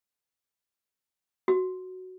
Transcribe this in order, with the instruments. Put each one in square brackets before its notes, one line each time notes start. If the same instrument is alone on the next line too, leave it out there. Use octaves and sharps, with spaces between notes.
[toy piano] F#4